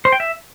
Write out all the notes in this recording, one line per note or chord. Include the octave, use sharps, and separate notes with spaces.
C5
G5
E5